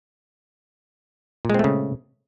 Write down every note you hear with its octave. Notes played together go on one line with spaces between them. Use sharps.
A#2 C#3 G#3 A3 C4